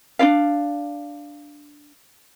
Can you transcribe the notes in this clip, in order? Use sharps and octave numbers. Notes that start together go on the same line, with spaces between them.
D4 F4 D5 F5